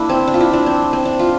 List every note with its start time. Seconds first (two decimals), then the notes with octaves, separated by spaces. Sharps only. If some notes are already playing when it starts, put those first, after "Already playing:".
Already playing: A#3 D4 E4
0.09 C4
0.27 D4
0.34 F4
0.40 E4
0.53 D4
0.66 C4
0.93 C4
1.05 D4
1.19 F4